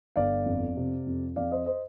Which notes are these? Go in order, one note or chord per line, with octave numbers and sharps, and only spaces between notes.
G1 D5 F5
F2
C3
F2
F2 D5 F5
C5 D#5
C5 D#5